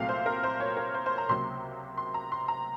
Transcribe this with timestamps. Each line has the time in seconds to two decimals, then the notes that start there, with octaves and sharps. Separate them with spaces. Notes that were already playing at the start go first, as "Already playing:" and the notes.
Already playing: C2 A#2 F#3 A3 C4 F5
0.09 C5
0.26 A#4
0.44 C5
0.60 C#5
0.77 A#4
0.95 C5
1.06 C5
1.18 A#5
1.28 C#2 C3 F#3 A#3 C6
1.98 C6
2.14 A#5
2.32 C6
2.48 A#5